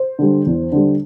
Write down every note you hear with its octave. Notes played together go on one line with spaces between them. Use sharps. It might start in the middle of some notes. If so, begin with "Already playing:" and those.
Already playing: C5
D3 G3
E2
D3 G3